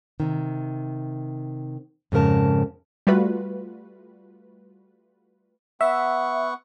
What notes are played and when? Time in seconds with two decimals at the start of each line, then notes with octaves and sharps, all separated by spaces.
0.20 C3 D#3
2.12 F2 G#2 C#3 A#4 A5
3.07 G3 A3 F4 F#4 B4
5.81 B3 E5 F#5 C#6